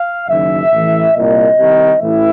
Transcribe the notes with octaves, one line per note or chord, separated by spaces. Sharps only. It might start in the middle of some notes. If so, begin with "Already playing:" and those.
Already playing: F5
F#1 F#2 D#3 E5
A1 A2 E3
C2 A#2 D#5
C2 C3 D#3
A1 A2 E3 E5